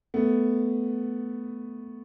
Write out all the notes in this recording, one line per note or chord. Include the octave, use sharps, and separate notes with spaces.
A3 B3